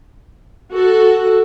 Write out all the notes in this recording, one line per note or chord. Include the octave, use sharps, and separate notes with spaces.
F#4 A4